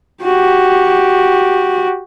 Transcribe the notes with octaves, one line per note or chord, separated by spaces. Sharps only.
F#4 G4